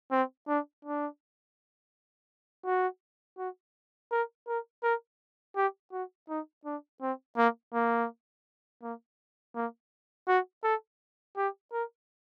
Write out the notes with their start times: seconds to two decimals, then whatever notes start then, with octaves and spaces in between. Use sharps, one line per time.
0.12 C4
0.48 D4
0.85 D4
2.65 F#4
3.38 F#4
4.11 A#4
4.48 A#4
4.83 A#4
5.56 G4
5.92 F#4
6.29 D#4
6.65 D4
7.01 C4
7.37 A#3
7.74 A#3
8.82 A#3
9.55 A#3
10.28 F#4
10.64 A4
11.37 G4
11.73 A#4